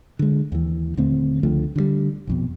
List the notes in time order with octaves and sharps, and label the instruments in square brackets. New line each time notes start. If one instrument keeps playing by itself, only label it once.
[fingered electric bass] D3 G#3
D#2 E3
D#1 D3 A3 C4
C#2 D3 F3 A3
D3 E3 G3
A#1 F2 B2